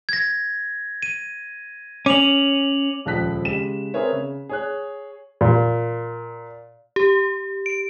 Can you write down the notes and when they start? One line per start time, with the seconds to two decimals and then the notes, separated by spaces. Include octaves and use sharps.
0.09 G#6 A#6
1.03 D#7
2.06 C#4 D6 F7 F#7
3.05 D#1 C#2 F3 A5 F#6 B6
3.44 C#3 G#3 G4 E7
3.94 C4 G#4 A#4 B4 C#5 E5
4.12 C#3
4.49 G#4 C#5 F#6
5.41 A#2
6.96 G4
7.66 D7